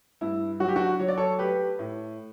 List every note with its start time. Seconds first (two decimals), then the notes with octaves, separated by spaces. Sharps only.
0.21 G2 E4
0.60 F#3 F#4
0.68 G4
0.76 D4 F#4
1.00 F#3 C#5
1.08 D5
1.17 A4 C#5
1.39 A3 G4 B4
1.79 A2